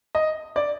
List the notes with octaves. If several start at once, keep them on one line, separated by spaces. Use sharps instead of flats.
D#5
D5